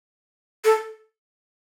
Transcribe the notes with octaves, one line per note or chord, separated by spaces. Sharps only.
A4